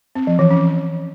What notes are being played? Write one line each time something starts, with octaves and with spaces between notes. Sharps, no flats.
C4
F3
E3
C#4